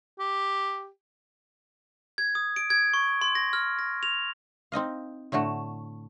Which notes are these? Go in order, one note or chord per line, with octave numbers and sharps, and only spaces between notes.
G4
G#6
D#6
D7
G#6
C#6
C6
A#6
F6
A#6
F7
C4 D#4 D#5 F5
A2 D3 A3 F#4